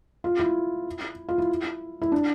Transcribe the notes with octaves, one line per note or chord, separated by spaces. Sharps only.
F4
E4
F4
E4
E4
D4